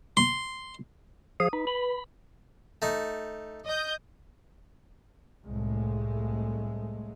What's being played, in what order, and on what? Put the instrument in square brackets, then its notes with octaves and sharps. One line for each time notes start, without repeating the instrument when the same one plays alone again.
[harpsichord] C6
[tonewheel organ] F3 G#4 F5 [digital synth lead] D#6
[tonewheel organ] D#4 [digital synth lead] B4
[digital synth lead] B4 [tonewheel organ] B5
[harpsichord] A3 D#4
[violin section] D#5 G6
[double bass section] C2 A2 G#3 A3